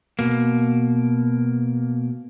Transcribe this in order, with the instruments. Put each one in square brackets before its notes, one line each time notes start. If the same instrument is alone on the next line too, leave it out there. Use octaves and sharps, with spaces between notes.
[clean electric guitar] B2 A#3